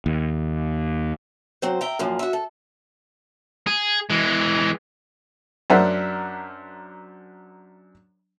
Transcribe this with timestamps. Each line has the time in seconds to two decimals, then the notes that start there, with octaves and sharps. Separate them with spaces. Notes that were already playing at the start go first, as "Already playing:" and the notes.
0.06 D#2
1.62 F#3 C4 C5
1.81 E5 G5 A#5
1.99 F#2 A#2 F3
2.19 F#4 E5
2.33 A4
3.67 G#4
4.10 E3 G#3
5.70 F#2 D4 A#4 C5 E5 F#5